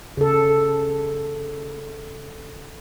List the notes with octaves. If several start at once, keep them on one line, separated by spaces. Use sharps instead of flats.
C#3 A4